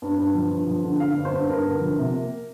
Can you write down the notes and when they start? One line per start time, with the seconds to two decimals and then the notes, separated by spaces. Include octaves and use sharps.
0.02 G2
0.18 G2
0.35 F3
0.51 G2
0.67 F3
0.84 D3
1.00 D3 F5
1.16 G2
1.25 C5
1.33 G2
1.49 G2 A#4
1.66 D3
1.81 F3
1.99 C3
2.14 A#3